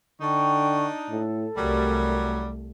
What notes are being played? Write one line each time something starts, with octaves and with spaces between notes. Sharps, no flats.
D3 D4 D#4 G5 C#6
A2 A4
C2 F#3 G3 A3 A#4